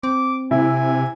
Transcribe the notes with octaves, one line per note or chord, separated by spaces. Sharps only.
C4 D6
C3 E4 G#5